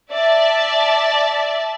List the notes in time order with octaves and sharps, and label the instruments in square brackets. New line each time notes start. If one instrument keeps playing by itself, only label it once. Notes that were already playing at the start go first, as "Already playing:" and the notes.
[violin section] D5 E5 A5